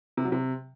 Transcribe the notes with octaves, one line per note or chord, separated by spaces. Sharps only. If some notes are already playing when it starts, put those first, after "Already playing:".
C3
F#3
C3